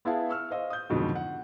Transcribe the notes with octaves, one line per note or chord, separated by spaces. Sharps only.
B3 E4 G#4 E5 F5 A5
C#6 E6 F6
C5 D#5 F5
D#6 G6
F2 G#2 B2 D3 D#3 F#3
F#5